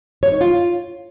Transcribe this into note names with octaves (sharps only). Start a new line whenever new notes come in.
C#5
D#4
F4